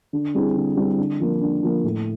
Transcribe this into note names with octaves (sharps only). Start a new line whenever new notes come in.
D3
G3 C4 E4 G#4
D3
G3 C4 E4 G#4
D3
F3 A#3
D3
F3 A#3
A2